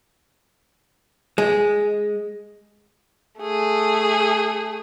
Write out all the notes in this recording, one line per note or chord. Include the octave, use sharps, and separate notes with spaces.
G#3
A3 G#4